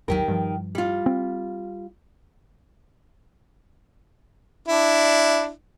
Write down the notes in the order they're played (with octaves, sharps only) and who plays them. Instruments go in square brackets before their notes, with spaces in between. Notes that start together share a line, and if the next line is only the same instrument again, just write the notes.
[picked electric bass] G#1 D#2 F#3 [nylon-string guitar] D#3 G4 A#4
[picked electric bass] G2 F3
[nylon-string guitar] G3 F4
[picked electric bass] C4
[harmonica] D4 E4